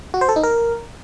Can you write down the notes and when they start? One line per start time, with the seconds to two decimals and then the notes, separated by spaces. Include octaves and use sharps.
0.14 F#4
0.21 C5
0.29 A4
0.36 D#4
0.43 A#4